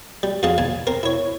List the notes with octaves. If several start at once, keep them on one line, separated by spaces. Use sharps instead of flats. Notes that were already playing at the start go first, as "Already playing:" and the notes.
G3
F2 G#2 F4 G#4 F5 A5
D#2 G#5 A5
C4 A#4
E4 C#5